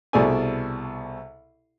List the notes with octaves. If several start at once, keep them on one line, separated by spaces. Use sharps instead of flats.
C2 B2 G#4 A4 D5 G#5